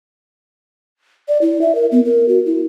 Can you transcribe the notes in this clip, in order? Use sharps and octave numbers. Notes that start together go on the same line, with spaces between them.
D5
E4
E5
A#4
B3
A#4
F#4
E4